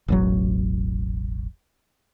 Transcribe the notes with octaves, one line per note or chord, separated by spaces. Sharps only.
E1 A1 F#3